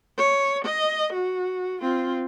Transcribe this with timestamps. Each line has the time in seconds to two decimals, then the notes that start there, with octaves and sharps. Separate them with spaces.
0.17 C#5
0.65 D#5
1.13 F#4
1.81 C4 F4